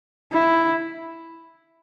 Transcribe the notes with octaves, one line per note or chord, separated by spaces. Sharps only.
E4